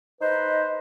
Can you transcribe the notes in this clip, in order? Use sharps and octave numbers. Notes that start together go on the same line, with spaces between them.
D#4 B4 C5 D#5